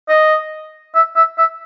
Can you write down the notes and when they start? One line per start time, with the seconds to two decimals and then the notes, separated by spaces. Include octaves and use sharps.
0.08 D#5
0.95 E5
1.16 E5
1.38 E5